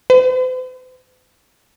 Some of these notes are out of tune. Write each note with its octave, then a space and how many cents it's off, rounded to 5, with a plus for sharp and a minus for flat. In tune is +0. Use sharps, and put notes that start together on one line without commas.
C5 -45